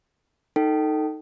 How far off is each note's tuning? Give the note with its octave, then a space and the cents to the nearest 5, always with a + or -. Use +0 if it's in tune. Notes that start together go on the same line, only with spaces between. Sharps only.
D#4 +0 A4 +20 G5 -25